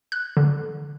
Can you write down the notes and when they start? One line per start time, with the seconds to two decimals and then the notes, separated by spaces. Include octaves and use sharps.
0.12 F#6
0.37 D3